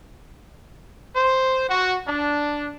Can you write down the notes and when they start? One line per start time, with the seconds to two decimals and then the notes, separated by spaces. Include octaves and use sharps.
1.15 C5
1.69 F#4
2.07 D4